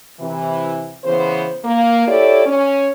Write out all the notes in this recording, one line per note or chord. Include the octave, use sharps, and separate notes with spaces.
C3 E3
C#3 E3 B3 C5
A#3
E4 G4 A4 C#5 D5
C#4